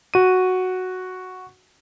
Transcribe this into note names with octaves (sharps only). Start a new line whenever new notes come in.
F#4 D#7